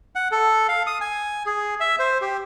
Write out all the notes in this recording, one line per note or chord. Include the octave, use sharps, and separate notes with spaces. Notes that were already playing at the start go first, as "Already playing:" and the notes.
F#5
A4
F5
D#6
G#5
G#4
E5
C5
G4